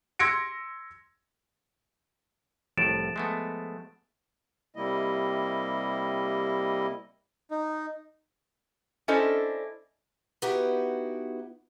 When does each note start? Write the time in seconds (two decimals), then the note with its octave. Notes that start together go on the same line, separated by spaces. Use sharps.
0.19 C6 E6 G#6 A#6 C#7 D7
2.78 C2 A2 F3 A6 D7 E7
3.16 G#3 A3 B3
4.76 C3 G3 A#3 E4 D#5
7.51 D#4
9.08 C#4 D4 E4 A4 C5 D#5
10.42 B3 D#4 E4 F#4 G4 B4